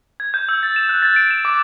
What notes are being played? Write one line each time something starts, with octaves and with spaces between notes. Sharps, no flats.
G#6
G6
E6
A6
E7
F#6
A6
D7
E7
D6